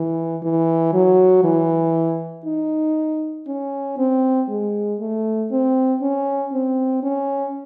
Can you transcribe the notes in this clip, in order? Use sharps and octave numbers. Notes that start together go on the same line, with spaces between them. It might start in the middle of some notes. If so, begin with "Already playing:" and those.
Already playing: E3
E3
F#3
E3
D#4
C#4
C4
G#3
A3
C4
C#4
C4
C#4